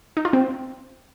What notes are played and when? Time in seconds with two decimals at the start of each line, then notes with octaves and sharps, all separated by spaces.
0.17 D#4
0.25 F4
0.33 C4